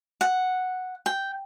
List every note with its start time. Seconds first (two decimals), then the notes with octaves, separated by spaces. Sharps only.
0.21 F#5
1.06 G5